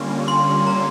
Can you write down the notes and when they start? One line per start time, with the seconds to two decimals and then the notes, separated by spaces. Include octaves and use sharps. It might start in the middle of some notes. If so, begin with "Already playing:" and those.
Already playing: D3 G3 A#3 C#4 F4
0.28 C6
0.67 A#5